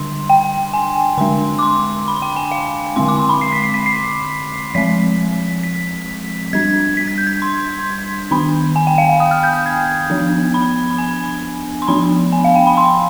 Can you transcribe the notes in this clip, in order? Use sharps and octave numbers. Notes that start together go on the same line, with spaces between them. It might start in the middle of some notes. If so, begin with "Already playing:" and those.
Already playing: D3 G3 D4 C6
G5
G#5
D3 G#3 D4 C6
D6
C6
B5
G5
G#5
F5
D3 G#3 C4 C6
D6
C6
B5
C7
B6
C7
B6
C7
F3 G#3 C4 B6
B6
G3 D4 G#6
B6
G#6
G6
G#6
C6
D#3 B3 D4 B5
G#5
G5
F5
F5
D#6
F6
G6
G6
G#6
F3 B3 D4
B5
B5
G#5
C6
F3 B3 D4 B5
G#5
F5
G5
B5
C6